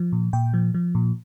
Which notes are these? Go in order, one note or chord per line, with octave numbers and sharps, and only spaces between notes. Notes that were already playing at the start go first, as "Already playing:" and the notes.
Already playing: F3
A#2
A#2 G5
F3
F3
A#2